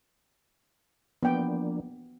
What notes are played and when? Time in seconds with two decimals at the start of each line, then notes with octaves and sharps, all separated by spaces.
1.23 F3 A#3 B3 D4 G5